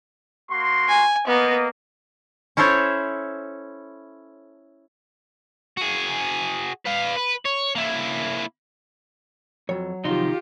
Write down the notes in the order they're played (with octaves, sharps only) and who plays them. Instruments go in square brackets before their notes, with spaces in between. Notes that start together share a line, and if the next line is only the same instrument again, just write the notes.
[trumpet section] A#3 F#4 C6
[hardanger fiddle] G#5
[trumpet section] A#3 D#5 [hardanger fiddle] B3
[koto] C#4 E4 A4 C5 C#5
[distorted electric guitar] F#4 G#4
B4 F5
B4
C#5
A#3 E4
[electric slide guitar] F2 [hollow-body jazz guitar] F#3 C#5
[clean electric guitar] C3 F3 C6 [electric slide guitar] D#3 D#4 [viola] F4 G4